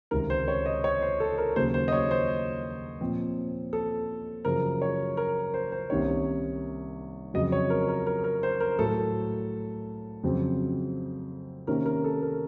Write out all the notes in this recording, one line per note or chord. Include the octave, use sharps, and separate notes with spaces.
C#2 C3 D#3 A#4
C5
C#5
D#5
C#5
C5
A4
A#4
D#2 C#3 F#3 C5
C5
D#5
C#5
C5
A#2 F3 C4
A4
F#2 C#3 F3 A#4
C#5
A#4
C5
C5
C2 C3 D#3 A#3 C#4 C#5
F2 C#3 F#3 D#5
C#5
A#4
A#4
A#4
A#4
C5
A#4
A2 F#3 A3 A4
F2 C#3 F#3 C4
C3 D#3 A#3 C#4 A#4
A#4
A4
A#4